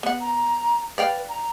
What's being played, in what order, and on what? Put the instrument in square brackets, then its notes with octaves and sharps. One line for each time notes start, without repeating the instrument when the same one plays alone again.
[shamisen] B3 F#5
[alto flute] A#5
[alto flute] B4 [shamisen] D5 F5 G5
[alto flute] A#5